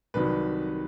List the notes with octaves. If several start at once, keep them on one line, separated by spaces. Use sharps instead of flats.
C2 C3 D#3 F#3 B4